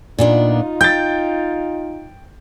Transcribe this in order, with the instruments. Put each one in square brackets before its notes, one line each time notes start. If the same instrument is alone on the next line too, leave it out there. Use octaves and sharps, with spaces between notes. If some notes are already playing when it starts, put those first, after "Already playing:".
[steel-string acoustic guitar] A#2 B3 D4 [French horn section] D#4 F4
[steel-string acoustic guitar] G5 [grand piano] G6 A6